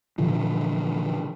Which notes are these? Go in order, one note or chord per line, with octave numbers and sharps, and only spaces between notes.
A#2 D3 E3 F3